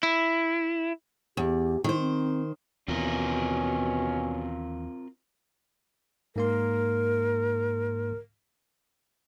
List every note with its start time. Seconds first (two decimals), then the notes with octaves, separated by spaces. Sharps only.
0.03 E4
1.37 E2 G4
1.84 D#3 E4 C5
1.99 C4
2.88 D#2 B2 E3 C4 C#4 F4 A#4
6.36 G#2 A#3 A#4 C6